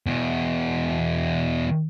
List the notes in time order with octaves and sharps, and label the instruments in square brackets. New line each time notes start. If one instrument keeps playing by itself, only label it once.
[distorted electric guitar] E2 B2